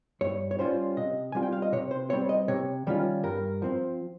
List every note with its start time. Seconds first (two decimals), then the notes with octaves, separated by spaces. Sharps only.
0.21 G2 C#5
0.51 C#5
0.59 G3 C#4 F4 C5
0.97 C3 D#5
1.32 G3 C4 F4 G#5
1.42 G5
1.52 F5
1.62 D#5
1.72 C3 C#5
1.91 C5
2.10 G3 C4 C#5
2.29 D#5
2.48 C3 C#5
2.87 D#3 G3 C#4 F4
3.23 G2 A#4
3.62 F3 C4